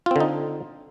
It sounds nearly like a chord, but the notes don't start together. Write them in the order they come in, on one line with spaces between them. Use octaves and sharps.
F4 C4 D3 D#4